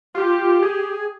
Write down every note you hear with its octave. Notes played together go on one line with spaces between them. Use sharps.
F4 G4
G#4